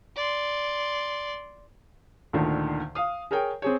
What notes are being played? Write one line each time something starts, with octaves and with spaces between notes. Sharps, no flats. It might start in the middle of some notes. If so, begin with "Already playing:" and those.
D5 C6
D2 A#2 D3 D#3
F5 D#6
G#4 A#4 C#5 G5
C4 G#4 C#5